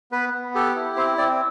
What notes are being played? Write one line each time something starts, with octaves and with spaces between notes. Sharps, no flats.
B3 B4
B3
G4 A4
E4
C4 C5
C4 D5